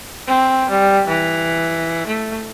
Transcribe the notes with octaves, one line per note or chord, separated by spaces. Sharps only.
C4
G3
E3
A3